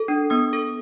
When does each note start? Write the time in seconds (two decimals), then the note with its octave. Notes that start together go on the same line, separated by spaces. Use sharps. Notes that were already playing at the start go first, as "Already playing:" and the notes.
Already playing: A4
0.08 D4
0.30 B3 D#6
0.53 A4